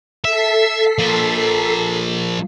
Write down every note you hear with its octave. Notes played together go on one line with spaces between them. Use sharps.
A4 E5 B6 C7
F3 A#3